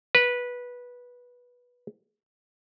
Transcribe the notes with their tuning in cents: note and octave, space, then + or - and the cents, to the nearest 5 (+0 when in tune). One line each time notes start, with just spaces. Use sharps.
B4 -15